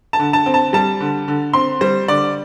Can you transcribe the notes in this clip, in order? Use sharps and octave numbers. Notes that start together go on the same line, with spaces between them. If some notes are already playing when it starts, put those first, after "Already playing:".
A5
D3
A5
C4
A5
G3 A5
D3
D3
C4 C6
G3 C5
D3 D5